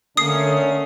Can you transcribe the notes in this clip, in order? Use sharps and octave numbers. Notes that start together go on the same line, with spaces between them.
D3 A3 A#3 C#4 D#6 C7